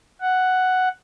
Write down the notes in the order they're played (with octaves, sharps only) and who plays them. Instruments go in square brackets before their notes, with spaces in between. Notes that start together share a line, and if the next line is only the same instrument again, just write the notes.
[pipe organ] F#5